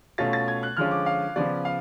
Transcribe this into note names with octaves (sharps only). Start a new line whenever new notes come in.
B2 A3 C#4 F4 A6
A6
G#6
F#6
D3 F3 G#3 C#4 F4 F6
D6
F5
C#3 F3 B3 F4 D5
F5